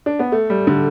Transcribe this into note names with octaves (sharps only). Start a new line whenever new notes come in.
D4
B3
A3
G3
D3